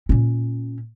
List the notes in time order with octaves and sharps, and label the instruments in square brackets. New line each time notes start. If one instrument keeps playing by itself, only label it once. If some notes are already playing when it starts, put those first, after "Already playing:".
[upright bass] A#2 C#4